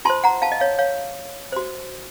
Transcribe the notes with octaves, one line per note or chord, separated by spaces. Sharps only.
F4 C5 A5 C6
F#5 A#5
F5 A5
D#5
C#5 F5
C#5 F5
F#4 C5